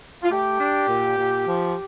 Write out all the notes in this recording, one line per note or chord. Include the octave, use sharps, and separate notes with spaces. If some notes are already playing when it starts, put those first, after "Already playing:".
F4
A3 G4
D4
A#2
A#2
F3